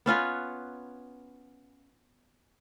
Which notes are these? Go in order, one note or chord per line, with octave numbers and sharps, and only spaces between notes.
B3 C#4 F4 B4